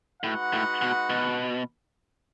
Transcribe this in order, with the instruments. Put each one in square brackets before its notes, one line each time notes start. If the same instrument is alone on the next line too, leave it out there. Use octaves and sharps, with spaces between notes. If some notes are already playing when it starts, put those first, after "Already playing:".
[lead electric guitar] A2 [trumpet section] G#3 D#4 F#4 B4 F#5
[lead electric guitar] A2
B2
B2